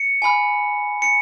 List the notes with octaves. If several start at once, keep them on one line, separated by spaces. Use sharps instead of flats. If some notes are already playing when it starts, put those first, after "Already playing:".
Already playing: C#7
G#5 B5 F6
C#7